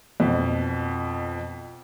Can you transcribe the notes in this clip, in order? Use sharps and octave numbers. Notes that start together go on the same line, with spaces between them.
F2 B2